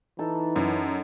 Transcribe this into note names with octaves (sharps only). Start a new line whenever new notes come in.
E3 D#4 A4
F#2